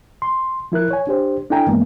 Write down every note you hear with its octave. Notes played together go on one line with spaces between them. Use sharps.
C6
F3 E4 A#4 F#6
C#5 G#5
D4 G4 C5
D4 E4 A4 G5 G#5 A#5
G2 E3 G#3 A#3 B3